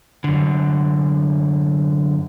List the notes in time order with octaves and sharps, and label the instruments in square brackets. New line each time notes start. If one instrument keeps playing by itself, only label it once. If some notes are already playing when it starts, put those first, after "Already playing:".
[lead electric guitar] F#2 D3